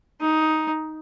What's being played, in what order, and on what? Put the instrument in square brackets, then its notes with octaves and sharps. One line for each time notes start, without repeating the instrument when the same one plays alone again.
[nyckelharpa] D#4